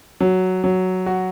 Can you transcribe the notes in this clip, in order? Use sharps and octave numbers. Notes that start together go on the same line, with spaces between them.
F#3
F#3
F#4